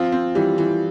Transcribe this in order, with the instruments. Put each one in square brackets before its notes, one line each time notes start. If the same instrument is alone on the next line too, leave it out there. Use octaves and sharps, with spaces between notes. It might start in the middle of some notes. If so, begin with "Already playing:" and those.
Already playing: [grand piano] F3 F4 [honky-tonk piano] C4
[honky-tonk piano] C4
[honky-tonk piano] E3 [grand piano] G3 G4
[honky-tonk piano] E3